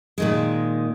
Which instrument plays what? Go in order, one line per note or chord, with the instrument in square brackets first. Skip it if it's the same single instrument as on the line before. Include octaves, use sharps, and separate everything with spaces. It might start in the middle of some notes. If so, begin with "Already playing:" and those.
[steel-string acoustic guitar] A#2 D#3 G#3